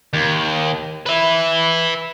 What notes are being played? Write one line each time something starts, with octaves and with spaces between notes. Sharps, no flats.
D#2
B4 E5